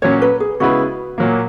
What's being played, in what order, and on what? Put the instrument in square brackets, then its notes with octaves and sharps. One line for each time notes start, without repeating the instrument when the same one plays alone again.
[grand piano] A#2 F#3 C#4 [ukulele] C#5
[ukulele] B4
G#4
[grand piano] C#3 G#3 B3 E4 B4 [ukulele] F#4
[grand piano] A#2 F#3 A#3